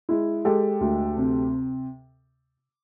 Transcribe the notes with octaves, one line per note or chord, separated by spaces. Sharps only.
G#3 E4
G#3 G4 A4
D2
C3